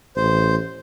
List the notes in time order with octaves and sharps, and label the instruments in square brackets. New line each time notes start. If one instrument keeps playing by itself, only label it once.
[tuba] A1 [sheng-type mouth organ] C5